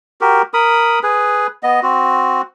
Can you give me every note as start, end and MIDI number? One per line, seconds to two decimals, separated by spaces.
0.21 0.42 66
0.21 0.42 67
0.21 0.42 70
0.54 0.99 70
0.54 0.99 83
0.54 0.99 87
1.03 1.47 68
1.03 1.47 71
1.63 1.80 59
1.63 1.80 75
1.83 2.42 60
1.83 2.42 66